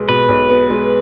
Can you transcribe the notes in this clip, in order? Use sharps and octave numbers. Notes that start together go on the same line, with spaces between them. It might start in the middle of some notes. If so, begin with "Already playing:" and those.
Already playing: B1 G#3 B3
B2 B4
B1
B3
G#3